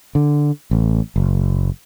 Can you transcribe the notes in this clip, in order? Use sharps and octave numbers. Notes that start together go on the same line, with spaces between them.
D3
A1
F#1